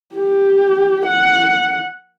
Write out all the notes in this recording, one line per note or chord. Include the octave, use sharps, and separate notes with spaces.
G4
F#5